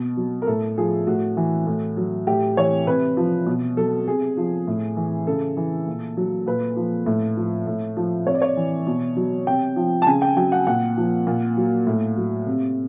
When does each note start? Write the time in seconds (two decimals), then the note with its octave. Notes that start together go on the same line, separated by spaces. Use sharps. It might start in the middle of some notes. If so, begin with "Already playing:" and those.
Already playing: B2
0.17 F#3
0.42 A#4
0.47 A2 A4
0.78 F3 G#4
1.07 A2 F#4
1.37 E3
1.67 A2
1.97 F#3
2.27 A2 G4
2.57 E3 C#5
2.87 C3 B4
3.17 F3
3.47 B2
3.77 F#3 A4
4.07 C3 G#4
4.37 F3
4.67 A2
4.97 E3
5.27 C#3 A4
5.57 E3
5.87 A#2
6.17 F#3
6.47 A#2 B4
6.76 F3
7.06 A2
7.37 F3
7.67 A2
7.97 F3
8.27 C3 C#5
8.35 D5
8.42 C#5
8.57 E3
8.87 B2
9.16 F#3
9.47 C3 G5
9.76 F3
10.02 A5
10.06 C#3 G#5
10.22 G5
10.37 F#3 G5
10.52 F#5
10.67 A#2 F#5
10.97 F3
11.27 A#2
11.57 F#3
11.87 A2
12.17 F#3
12.47 C3